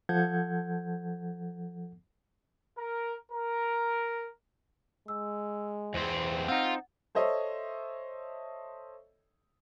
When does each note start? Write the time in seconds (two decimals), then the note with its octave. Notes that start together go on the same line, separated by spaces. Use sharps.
0.09 F3 A4 F#5 G6 G#6
2.77 A#4
3.32 A#4
5.08 G#3 E6
5.94 E2 C4 C5
6.48 C4 D#4 F4 F#5
7.15 A4 C5 C#5 D#5 E5